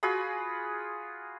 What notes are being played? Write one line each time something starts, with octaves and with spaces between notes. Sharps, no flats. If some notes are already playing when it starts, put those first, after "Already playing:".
F4 F#4 G#4 B5